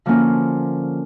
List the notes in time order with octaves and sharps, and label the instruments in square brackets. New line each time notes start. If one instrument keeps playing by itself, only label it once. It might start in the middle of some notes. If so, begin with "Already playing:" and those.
[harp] D3 F3 A#3 C#4 F4